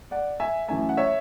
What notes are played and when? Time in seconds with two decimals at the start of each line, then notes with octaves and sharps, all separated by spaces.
0.11 D5 F#5
0.40 E5 G#5
0.68 F#2 E3 A3 E5 G#5
0.89 F#5
0.97 C#5 E5